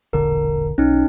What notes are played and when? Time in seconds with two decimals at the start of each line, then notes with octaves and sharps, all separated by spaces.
0.13 E1 A#1 D3 A#4
0.78 B1 C#4 D#4